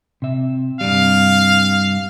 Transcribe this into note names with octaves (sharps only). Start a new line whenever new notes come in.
C3 E5
G2 C3 G3 F5